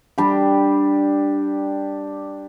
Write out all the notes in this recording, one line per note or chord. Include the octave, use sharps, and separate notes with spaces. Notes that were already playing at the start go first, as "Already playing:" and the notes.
G3 D4 G4